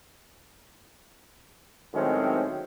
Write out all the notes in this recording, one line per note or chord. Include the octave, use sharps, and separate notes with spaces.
A2 D#3 F#3 G#3 C4 C#4